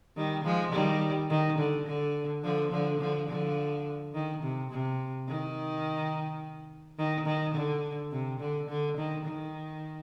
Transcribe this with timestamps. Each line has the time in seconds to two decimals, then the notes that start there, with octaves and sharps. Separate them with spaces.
0.16 D#3 G3
0.44 F3 G#3
0.72 D#3 G3
1.30 D#3
1.59 D3
1.86 D3
2.44 D3 F3
2.71 D3 F3
3.00 D3 F3
3.29 D3 F3
4.14 D#3
4.43 C3
4.71 C3
5.28 D#3
6.98 D#3
7.26 D#3
7.55 D3
8.12 C3
8.40 D3
8.69 D3
8.97 D#3
9.26 D#3